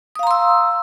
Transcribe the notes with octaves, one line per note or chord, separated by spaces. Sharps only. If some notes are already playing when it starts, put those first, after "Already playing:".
F5 A#5 C6 D#6 E6